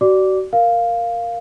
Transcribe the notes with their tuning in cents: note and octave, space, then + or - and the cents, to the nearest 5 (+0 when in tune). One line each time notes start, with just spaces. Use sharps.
F#4 +35 D5 +0 D6 -10
A#4 +0 F5 +0